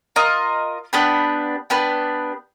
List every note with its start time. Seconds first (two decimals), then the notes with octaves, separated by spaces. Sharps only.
0.16 F4 A#4 D#5
0.93 B3 D4 G4 B4
1.70 B3 D4 G4 B4